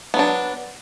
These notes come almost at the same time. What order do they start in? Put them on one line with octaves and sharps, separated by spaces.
B3 F#3 D4